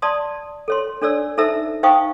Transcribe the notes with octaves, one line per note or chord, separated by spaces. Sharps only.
D5 A5 C6 D#6
A4 C#5 C6
D4 A4 C#5 D5 E6
D#4 A4 C5 E5 A#5 E6
D#4 C5 F5 G5 C#6 D#6